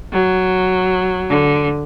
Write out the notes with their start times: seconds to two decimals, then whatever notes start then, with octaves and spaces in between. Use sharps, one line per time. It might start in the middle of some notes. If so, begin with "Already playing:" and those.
0.14 F#3
1.30 D3